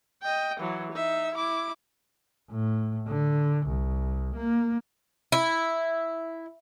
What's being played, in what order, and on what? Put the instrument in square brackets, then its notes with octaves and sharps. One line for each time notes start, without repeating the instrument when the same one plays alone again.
[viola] D#5 G5
E3 F#3
D#4 E5
E4 D6
[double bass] A2
D3
C2
A#3
[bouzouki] E4